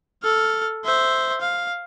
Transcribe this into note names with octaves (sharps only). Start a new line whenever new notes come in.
A4 F6
C5 E5
F5